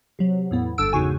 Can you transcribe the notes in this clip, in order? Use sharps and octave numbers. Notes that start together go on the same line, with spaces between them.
C3 F#3
E2 A2 B3
G1 G2 A4 E6 D7
E2 G#2 C#3 F#4 G#5